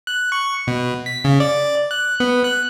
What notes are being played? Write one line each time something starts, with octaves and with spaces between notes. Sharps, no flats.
F#6
C#6
B2
B6
C#3
D5
F#6
B3
F#6